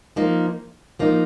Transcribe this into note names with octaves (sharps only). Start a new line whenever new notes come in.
F3 A#3 D#4
F3 A#3 D#4